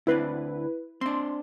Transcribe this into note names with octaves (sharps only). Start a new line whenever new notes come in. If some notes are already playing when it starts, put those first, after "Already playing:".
D2 C4 D4 E4 B4
C4 D4 C6